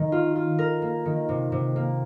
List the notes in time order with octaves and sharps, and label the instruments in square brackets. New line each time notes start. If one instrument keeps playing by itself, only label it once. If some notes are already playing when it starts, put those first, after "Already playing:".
Already playing: [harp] D#3
F4
F4
A#4
A#3
D#3
C3
C3
A#3